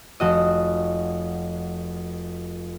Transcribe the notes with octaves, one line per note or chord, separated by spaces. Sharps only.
F1 F#4 D#5